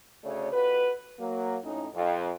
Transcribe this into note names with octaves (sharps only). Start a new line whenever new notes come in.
D2 C#3 A3 C#5 D5
F2 F#4 B4
F#3 A#3
F2 A2 C#4 D#4
F2